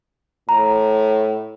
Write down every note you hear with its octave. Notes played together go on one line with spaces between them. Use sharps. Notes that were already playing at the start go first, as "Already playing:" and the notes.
A2 A#5